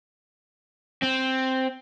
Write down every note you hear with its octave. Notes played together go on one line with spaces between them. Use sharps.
C4